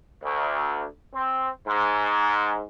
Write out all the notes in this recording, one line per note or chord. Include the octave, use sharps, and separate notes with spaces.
D2
C4
G#2